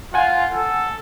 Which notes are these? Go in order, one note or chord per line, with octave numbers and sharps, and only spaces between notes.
F4 F#5 G#5
A4